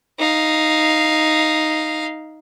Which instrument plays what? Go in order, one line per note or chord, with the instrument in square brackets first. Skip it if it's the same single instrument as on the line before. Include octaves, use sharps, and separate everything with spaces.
[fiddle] D#4 F5